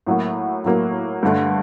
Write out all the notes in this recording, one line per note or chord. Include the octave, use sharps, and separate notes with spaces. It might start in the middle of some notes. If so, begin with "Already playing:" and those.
A2 F#3 A#3 F#4
A2 F#3 A#3 F#4
G2 D3 A3